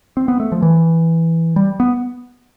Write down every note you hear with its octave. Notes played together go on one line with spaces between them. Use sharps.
C4
B3
A3
F3
E3
G3
B3